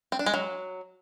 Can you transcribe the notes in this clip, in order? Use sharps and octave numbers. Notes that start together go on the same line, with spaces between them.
C4
D4
G#3
F#3